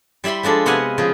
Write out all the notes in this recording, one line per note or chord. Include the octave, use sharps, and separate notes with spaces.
G3 E4 E5 B5 C6
F3 G#3 D4 A4
C3 B3 D#5 F5 F#5 G#5
C#3 F3 G#4